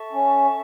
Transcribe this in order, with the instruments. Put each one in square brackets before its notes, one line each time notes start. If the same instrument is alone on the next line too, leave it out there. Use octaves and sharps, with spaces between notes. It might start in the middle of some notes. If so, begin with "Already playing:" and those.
Already playing: [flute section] A4 E5 A5 C#6
[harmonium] C#4